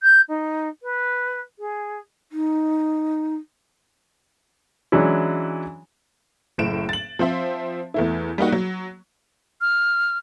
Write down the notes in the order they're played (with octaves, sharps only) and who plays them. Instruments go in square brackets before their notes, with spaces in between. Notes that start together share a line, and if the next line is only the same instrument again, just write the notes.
[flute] G6
D#4
B4
G#4
[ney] D#4
[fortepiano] E3 F#3 G#3 C#4 D4 E4
[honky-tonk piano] F#1 A2 D7 E7
A6 F#7
F3 C4 C5 E5
E2 A3 E4
G3 A#3 D#4 F#4
F#3
[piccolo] F6